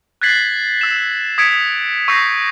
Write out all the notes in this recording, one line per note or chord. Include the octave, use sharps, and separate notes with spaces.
F#6 G#6 A6 B6 C7 F#7
E6 E7
D#6 G#6 B6 C#7 D7
C#6 E6 G6 A#6 C7